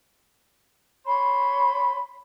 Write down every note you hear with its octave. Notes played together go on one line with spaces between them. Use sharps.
C#5 B5 C6